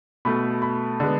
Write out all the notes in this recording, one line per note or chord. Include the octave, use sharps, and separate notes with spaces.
B2 A3 B5
B5
D3 G#3 B3